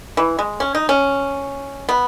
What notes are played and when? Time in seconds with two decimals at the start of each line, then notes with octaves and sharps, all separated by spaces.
0.17 E3
0.39 G#3
0.60 C#4
0.75 D#4
0.89 C#4
1.89 B3